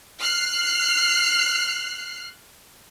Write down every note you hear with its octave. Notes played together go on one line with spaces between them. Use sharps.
F6 F#6 C7